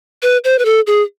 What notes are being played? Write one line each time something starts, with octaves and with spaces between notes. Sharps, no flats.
B4
C5
B4
A4
G#4